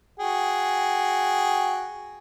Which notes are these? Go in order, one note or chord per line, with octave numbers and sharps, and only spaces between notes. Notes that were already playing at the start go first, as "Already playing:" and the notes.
F#4 G#4 G5